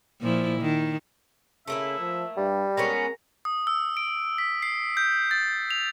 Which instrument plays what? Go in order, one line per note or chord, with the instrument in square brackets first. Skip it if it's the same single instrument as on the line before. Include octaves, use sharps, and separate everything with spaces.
[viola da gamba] A#2 F3 E4
D#3
[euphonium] C#3 [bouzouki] A3 A#3 E4 [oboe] E5
[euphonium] F3
[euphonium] G2 [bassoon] G3
[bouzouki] G#3 B3 C#4 [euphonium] A#4 [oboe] A#5
[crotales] D#6
E6
D7
B6
C7
G6
A6
F7